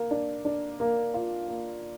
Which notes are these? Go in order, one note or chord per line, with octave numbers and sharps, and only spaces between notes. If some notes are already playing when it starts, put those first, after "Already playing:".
Already playing: A#3
D4
D4
A#3
F4
A#3